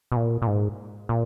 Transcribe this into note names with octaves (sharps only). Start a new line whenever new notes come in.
B2
A#2
A#2
G#2
A#2